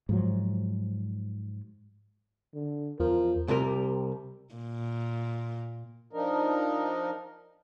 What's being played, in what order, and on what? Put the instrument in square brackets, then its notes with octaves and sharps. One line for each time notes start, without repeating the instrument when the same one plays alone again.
[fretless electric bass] G#2 F3 F#3
[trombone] D3
[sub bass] E2 [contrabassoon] F3 [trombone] A#4
[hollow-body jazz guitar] C2 C3 G3 A#4
[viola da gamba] A#2
[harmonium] F3 D4 D#4 A#4